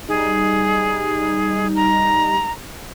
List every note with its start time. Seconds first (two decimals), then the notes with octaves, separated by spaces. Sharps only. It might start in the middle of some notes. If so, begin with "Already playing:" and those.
0.08 G3 D#4 G#4
1.76 A#5